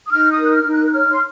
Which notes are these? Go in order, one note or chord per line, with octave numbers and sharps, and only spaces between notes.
D#6
D#4 F6
D#6
A#4
F#6
F6
D#4
F#6
F#6
C#5 F6
C6